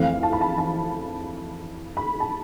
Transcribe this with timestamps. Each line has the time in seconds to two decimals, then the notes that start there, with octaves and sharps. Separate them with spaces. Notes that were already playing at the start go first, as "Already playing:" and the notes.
Already playing: F2 E3 A3 C4 F5
0.23 A5
0.33 B5
0.41 A5
0.58 A5
1.97 B5
2.20 A5